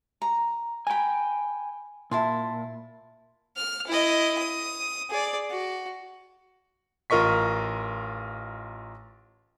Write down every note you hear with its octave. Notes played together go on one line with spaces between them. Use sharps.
A#5
G5 G#5 A#5 B5
A#2 E4 A5 C6
F6
E4 D#5
D#6
G#4 D5
F#4
A1 F4 A#4 D#5 C#6 B6